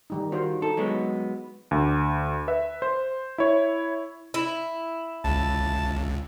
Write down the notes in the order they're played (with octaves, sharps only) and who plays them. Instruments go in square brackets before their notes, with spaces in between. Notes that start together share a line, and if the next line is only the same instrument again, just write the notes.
[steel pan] D#3 G3 D#4
[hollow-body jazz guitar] D#3 [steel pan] F4 F#4 C5
[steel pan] D#4 [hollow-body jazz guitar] A4
[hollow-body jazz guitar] F#3 G#3 B3
[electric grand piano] D2
B4 E5
C5
E4 C#5
[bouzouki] E4
[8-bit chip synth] C#2 [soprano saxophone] A5